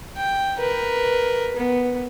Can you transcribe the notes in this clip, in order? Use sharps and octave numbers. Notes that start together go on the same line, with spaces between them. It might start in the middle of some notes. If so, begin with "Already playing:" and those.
G5
A#4 B4
B3